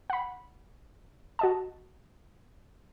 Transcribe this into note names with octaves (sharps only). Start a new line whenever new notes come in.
F#5 B5
F#4 D#5 A5